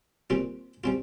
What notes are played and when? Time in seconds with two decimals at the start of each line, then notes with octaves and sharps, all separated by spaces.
0.30 A#2 G3 C4 F4
0.84 G3 C4 F4